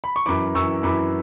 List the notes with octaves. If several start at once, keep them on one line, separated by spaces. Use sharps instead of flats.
B5
C#6
F#2 E3 B5 D6
F#2 E3 C#6 E6
F#2 E3 B5 D6